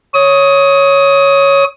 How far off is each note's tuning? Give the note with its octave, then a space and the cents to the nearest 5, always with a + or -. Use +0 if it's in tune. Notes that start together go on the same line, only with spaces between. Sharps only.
C#5 +0 D#6 +20